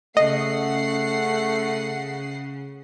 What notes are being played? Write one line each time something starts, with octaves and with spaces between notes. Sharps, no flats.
C#3 A3 D#5 F#5 C7